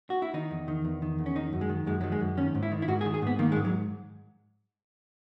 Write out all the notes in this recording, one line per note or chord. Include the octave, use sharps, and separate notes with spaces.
F#4
E4
D#3 D#4
E2
D#3
E2
D#3
E2
C#4
D#3 D#4
F#2
G#3
D#3
F#2 G#3
D#3 F#3
G#3
F#2
D#3 C#4
G#2
E4
D#3
E4
G#2 F#4
G#4
D#3
G#4
G#2 B3
D#3 A#3
G#3
G#2
F#3